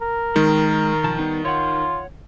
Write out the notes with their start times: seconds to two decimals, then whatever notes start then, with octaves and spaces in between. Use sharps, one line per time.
0.02 A#4
0.36 D#3 G#3
1.04 B1 F3 A5
1.18 G3 B3 D#4
1.45 F4 C#5 F#5